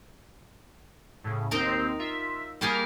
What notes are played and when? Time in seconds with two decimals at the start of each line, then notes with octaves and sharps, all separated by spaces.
1.24 A2 C#3
1.51 D#2 C4 D#4 A#4 C5 A#5
1.99 F4 E5
2.61 G3 A#3 G4 G#4 A#4 F6